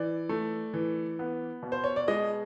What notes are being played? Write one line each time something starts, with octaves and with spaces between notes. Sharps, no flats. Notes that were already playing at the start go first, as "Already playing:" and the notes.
Already playing: E3 D5
A3
E3
B3
B2
C5
C#5
D5
G#3 D#5